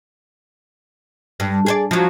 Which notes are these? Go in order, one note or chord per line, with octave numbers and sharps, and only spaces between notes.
G2
G#4 C5 D5
F3 F#3